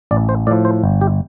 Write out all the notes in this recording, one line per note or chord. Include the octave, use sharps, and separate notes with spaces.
A1 D5
C5
A2 F3 D5
C5
G1
G4